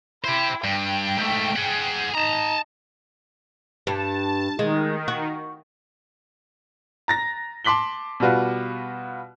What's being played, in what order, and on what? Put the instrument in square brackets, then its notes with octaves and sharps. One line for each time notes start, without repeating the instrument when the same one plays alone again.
[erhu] E4 [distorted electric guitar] G4 C5
[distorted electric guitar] G2 [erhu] G5
[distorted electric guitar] G#2 A3
G#4 F#5
[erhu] D#4 [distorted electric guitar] A5 A#5
[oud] G2 [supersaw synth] A5
[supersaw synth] D#3 [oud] G#3
[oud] F#4
[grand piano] A#5 A6 A#6
A5 C6 D6 B6 F#7 G7
B2 G3 B3 F4 F#4